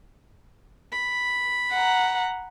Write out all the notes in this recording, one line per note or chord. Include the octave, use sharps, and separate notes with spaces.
B5
F#5 A#5